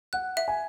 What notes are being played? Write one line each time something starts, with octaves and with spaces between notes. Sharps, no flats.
F#5 F#6
E5
G#5